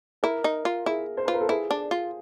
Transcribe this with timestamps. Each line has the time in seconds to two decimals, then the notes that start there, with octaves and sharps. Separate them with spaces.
0.23 E4 A#4
0.44 D#4
0.65 F4
0.86 E4 G#4
1.17 C5
1.25 F4 B4
1.34 A#4
1.41 A4
1.49 E4 G#4
1.71 D4
1.91 F4